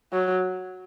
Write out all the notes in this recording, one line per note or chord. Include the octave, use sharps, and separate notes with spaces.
F#3